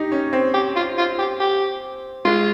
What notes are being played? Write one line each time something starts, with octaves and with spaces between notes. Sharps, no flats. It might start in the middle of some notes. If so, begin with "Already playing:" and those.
Already playing: D#4 G4
C#4
C4
G4
F4
F4
G4
G4
G#3 F4